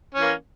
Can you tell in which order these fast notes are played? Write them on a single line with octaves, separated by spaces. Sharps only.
C#4 E3 A#3